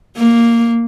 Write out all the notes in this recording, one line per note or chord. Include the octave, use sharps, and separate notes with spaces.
A#3